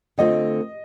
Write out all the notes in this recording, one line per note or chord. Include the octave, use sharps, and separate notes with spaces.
D3 A3 C4 F4 D#5